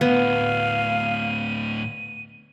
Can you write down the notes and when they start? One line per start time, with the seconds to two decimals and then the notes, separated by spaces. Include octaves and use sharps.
0.01 D2 A2 B3 F5 D#7